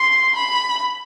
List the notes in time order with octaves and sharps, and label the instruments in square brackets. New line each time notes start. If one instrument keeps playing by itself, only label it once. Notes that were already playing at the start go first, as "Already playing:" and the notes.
Already playing: [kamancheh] C6
B5